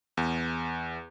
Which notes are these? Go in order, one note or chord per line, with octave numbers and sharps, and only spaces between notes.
E2